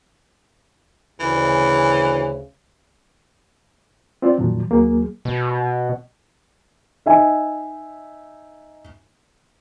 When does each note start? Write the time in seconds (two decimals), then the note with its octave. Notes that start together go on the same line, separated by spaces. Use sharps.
1.20 D2 C#3 E3
4.22 C4 F4 D5
4.38 F2 A#2 D#3 F3 F#3
4.70 D#2 F#3 A#3 G#4
5.25 B2
7.06 D#4 E5 G#5